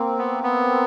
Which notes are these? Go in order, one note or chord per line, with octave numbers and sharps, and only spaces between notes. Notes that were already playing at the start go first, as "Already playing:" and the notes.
Already playing: A#3 C4
B3
B3